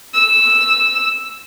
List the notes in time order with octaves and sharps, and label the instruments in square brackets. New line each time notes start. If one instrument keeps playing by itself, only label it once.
[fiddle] E6